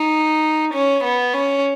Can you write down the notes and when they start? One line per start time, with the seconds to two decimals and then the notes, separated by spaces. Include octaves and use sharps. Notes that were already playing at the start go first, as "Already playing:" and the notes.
Already playing: D#4
0.74 C#4
1.04 B3
1.34 C#4